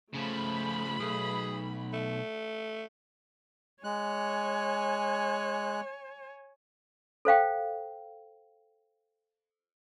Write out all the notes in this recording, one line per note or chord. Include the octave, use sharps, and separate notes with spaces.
C#3 F3 A3 B5
B1 G#4
A3
G#3 C#5 G#5 F#6
A4 C5 F5 G5